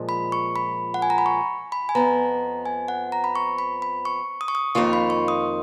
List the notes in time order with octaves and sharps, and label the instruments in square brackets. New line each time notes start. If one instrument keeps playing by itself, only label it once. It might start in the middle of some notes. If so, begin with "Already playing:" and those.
Already playing: [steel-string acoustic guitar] A#2 F3 G#3
[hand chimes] B5
C#6
B5
F#5
G#5
A#5
B5
C#6
B5
G#5
[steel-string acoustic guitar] F2 F3 B3 [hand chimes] A#5
[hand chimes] G#5
F#5
A#5
B5
C#6
B5
B5
C#6
D#6
C#6
D#6
[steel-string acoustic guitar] F2 D#3 A#3 F4 [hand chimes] C#6
[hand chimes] B5
C#6
D#6